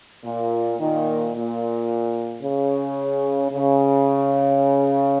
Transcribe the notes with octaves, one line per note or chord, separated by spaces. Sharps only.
A#2
A#2 D#3
A#2
C#3
C#3